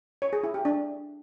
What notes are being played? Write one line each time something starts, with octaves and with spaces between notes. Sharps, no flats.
C#5
G#4
E4
G4
D4